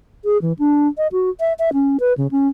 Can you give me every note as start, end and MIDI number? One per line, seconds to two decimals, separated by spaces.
0.25 0.38 68
0.42 0.53 52
0.59 0.88 62
0.98 1.07 75
1.12 1.30 66
1.40 1.53 76
1.59 1.70 76
1.73 1.97 61
2.00 2.13 71
2.18 2.27 49
2.31 2.48 61